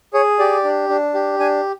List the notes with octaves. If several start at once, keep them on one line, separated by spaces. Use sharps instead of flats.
G#4 C#5
G4 D5
D4
D4
G4
D4 G#5